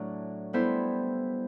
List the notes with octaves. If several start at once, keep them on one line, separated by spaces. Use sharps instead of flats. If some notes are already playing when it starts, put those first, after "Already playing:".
Already playing: A2 F#3 A3 D4
G3 B3 E4 A4 C5